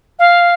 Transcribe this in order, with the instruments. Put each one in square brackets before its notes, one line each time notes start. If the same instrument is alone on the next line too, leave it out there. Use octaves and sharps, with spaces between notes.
[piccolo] F5